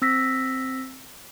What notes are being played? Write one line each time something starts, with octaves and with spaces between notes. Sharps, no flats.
C4 E6 A#6 B6